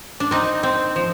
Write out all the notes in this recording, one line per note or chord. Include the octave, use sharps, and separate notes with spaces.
D4
C4 D#4
C4
F3